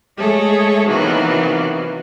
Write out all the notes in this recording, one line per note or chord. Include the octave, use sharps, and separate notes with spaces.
G#3 A3 G#4 A4 C#5
C3 D#3 E3 F#3 A#3 B3